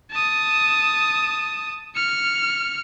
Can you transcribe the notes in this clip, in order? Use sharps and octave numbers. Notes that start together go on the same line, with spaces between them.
A5 D#6
F6 C#7